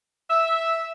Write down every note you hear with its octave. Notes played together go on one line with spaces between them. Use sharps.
E5